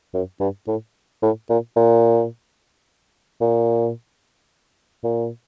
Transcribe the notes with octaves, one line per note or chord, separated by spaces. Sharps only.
F#2
G2
A2
A2
A#2
A#2
A#2
A#2